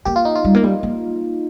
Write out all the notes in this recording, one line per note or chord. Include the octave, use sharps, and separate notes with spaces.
A#3 G4
F4
D#4
F4
G3
A#3
G3
A#3